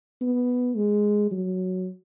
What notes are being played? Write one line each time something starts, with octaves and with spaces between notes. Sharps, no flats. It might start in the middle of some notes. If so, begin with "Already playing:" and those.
B3
G#3
F#3